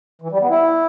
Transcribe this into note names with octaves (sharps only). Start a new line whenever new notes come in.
E3
G3
B3
E4